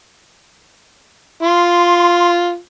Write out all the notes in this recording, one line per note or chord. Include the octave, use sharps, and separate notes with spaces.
F4 C6